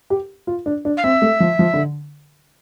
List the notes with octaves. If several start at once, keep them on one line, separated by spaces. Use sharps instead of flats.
G4
F4
D4
D4
F5
C4 E5
A3
F3
F3
D3